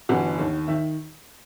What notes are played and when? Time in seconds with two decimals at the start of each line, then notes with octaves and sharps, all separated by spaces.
0.09 G1 F#2 E3 F#5
0.39 D#2 D#3
0.68 D#3 E5